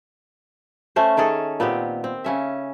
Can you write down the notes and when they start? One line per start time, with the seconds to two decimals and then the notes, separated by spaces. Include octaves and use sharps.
0.96 A3 C#4 C5
1.17 D#3 C#4 G#4 A4
1.60 A#2 B3 C4 G4
2.04 C4
2.24 C#3 C#4 E5